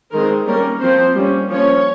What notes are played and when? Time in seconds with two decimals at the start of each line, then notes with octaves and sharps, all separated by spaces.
0.12 D#3 G#3 C4 A#4
0.46 G3 A#3 C#4 A#4
0.81 F3 C4 C5
1.15 G3 A#3 C#4
1.49 F3 A#3 C#4 C#5